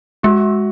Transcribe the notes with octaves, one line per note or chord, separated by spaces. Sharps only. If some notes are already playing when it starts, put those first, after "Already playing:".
G#3 F#4